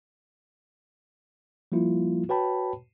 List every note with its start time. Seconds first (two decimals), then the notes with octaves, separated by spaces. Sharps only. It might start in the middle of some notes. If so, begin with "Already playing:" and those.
1.72 F3 G3 A#3 E4 F4
2.29 F#4 B4 C#5 G5 A5 B5